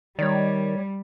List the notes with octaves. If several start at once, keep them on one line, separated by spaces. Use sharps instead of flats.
D#3 G3 C#5 D5